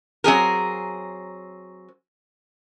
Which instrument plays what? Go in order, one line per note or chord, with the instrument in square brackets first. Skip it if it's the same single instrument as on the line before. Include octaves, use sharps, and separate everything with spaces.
[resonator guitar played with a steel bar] F#3 C4 G#4 A#4